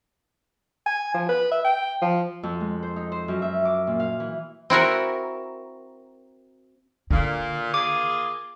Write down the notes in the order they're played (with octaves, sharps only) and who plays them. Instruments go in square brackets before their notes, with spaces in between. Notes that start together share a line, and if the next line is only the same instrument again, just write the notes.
[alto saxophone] G#5
F3
B4
E5
G5
F3
[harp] F2
G#3
C5
D#4
C5
F#2
E5
D6
A#2
F5
E3
[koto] C4 E4 F#4 A#4
[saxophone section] A#2 [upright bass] D3
[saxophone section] A#3 F4 G#4 [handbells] D6